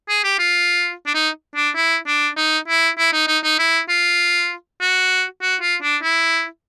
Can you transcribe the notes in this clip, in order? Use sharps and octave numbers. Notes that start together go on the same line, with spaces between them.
G#4
G4
F4
D4
D#4
D4
E4
D4
D#4
E4
E4
D#4
D#4
D#4
E4
F4
F#4
F#4
F4
D4
E4